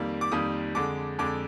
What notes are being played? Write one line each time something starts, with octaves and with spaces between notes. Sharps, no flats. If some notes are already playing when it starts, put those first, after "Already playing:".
Already playing: F2 D#3 G3 A#3
D6
F2 D#3 G3 A#3 D#6
F2 D3 G#3 D6
F2 D3 G#3 D6